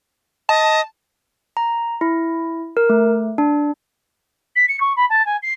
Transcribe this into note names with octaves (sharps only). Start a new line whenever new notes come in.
D#5 A5
A#5
E4
A#4
A3
D4
B6
C#7
C#6
B5
A5
G#5
C7